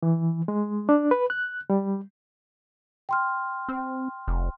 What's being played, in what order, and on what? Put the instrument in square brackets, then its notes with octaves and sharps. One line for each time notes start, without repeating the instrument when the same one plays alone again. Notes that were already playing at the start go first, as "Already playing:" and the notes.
[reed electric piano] E3
G#3
D4
B4
F#6
G3
[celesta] G5 C6 F6
[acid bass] C4
F1